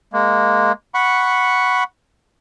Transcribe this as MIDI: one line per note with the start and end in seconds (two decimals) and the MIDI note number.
0.13 0.72 56
0.13 0.72 58
0.94 1.84 78
0.94 1.84 83
0.94 1.84 85